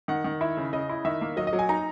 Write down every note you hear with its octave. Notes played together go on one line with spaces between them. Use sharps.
D#3 F#5
D#3
E4 E5
C#3
C#3 D#5
E4
D#3 E5
A#3
F#3 D#5
D#5
F#3
G#5
D#4 A#5